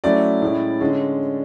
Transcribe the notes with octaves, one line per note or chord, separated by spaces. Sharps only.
F#3 A3 C#4 E4 D5
A2 G#3 C#4 E4
D3 G#3 C#4